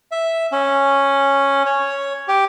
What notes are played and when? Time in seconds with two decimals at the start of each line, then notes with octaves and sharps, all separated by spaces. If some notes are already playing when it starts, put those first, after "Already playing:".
0.11 E5
0.52 C#4
1.66 C#5
2.28 G4